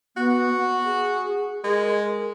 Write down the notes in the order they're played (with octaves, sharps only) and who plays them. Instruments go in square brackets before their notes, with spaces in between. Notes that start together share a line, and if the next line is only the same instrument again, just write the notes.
[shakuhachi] B3 [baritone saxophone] F#4
[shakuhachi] F#5
G#4
[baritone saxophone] G#3 [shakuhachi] A#4